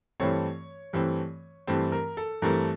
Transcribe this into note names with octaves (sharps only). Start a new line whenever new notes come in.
G2 E3 A3 C4 C#5
G2 E3 A3 C4
G2 E3 A3 C4
A#4
A4
G2 E3 A3 C4 A#4